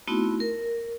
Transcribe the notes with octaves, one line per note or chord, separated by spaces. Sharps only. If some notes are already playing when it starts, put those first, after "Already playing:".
A3 B3 C4 D#4 E4 F#4
A#4